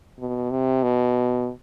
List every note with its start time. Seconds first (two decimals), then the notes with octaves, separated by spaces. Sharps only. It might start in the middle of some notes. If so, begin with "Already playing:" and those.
0.19 B2
0.51 C3
0.83 B2